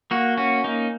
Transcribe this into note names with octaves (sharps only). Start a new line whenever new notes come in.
A#3 F#4
C#4 F#4
A#3 D#4